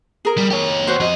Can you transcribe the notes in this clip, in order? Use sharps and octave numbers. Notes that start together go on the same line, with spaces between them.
G#4 A#4
G3
G4 C#5
F#4 C5
F2 D#5